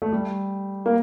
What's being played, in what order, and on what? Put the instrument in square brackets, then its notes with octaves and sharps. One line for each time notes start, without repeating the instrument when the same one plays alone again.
[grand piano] A3
G3
A#3